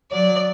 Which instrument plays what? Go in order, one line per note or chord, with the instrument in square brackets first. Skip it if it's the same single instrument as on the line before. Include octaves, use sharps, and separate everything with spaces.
[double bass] F#3 [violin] D5